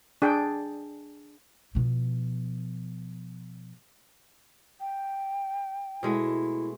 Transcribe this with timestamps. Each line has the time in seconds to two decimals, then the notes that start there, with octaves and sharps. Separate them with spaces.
0.22 D4 G#4 G5
1.75 B2 F3
4.80 G5
6.03 B2 G#3 A3 E4